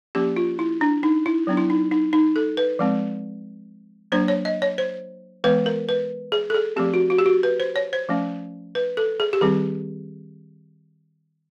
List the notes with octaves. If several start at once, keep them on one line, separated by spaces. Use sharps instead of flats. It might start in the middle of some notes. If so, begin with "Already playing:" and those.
F3 A#3 C#4 G4
F4
E4
D4
D#4
E4
F#3 B3 D4
E4
D#4
D#4
D#4
A4
B4
F3 G#3 C4
F#3 A#3 D4 C5
C#5
D#5
C#5
C5
E3 G#3 B3 B4
A#4
B4
G#4
A4
G#4
F3 A3 C4 G4
F#4
F#4
G4
F#4
B4
C5
C#5
C5
F3 A3 C#4
B4
A4
G#4
G4
D#3 G3 C4 G#4